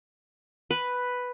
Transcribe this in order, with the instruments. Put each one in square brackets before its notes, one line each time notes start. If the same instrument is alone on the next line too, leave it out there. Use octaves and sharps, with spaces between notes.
[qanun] B4